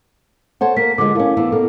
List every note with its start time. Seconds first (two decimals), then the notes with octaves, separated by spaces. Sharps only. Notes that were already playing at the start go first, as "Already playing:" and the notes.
0.61 A4 C5 C#5 F#5
0.77 A#3 A#4 B6
0.98 D3 F3 G#3 D6
1.15 A3 C#4 E4 A#4 F5
1.37 E3 B3 D4
1.52 B2 A#3 A4